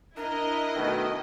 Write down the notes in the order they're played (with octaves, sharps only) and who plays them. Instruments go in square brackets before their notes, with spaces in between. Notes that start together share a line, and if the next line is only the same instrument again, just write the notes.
[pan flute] D4 [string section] E4 D#5 [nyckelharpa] A#4
[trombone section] B2 D#3 A3